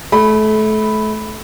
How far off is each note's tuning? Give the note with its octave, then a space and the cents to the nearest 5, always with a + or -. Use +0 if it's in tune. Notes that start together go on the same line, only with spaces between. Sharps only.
A3 -30 B5 +0